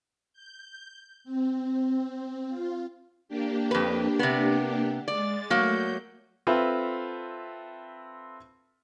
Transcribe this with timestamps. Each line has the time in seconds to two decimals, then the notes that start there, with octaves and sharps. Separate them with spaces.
0.33 G6
1.24 C4
2.48 F4
3.29 A#3 D4 G4
3.71 F2 B4
4.19 C3 B3
5.08 G#3 D5 A6
5.50 F#3 A3 A#3 G6
6.47 C4 F4 A4 B4 E5